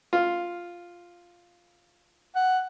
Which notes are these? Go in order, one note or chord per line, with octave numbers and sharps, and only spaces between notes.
F4
F#5